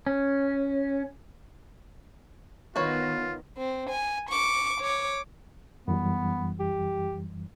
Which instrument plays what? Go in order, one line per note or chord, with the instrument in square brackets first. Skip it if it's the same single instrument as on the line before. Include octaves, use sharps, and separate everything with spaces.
[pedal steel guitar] C#4
[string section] D#3 B3 [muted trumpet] F4 [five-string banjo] F#4 B4 C#5
[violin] C4
G#5
C#6 D6
C#5 D6
[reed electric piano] F#2 E3 G3 [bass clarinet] B3
[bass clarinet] G4